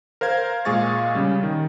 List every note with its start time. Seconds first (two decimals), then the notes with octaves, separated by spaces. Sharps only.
0.21 A#4 C5 F5 G#6
0.65 A#2 G#3 G#4 F5 C#6 A6
1.15 C#3 G3
1.43 D#3